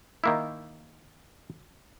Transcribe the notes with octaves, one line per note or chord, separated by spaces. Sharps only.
D#3 A#3 E4